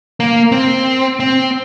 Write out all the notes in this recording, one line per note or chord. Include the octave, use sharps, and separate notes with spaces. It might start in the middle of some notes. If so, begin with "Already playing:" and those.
A#3
C4
C4